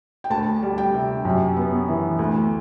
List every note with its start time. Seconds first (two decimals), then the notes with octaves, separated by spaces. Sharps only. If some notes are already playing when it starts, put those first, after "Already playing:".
0.24 G5
0.30 D2 A5
0.63 G3
0.78 G5
0.94 C3
1.25 F#2
1.57 B3
1.88 E3
2.19 D2